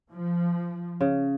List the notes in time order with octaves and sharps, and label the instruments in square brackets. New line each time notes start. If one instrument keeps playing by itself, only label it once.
[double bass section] F3
[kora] C#3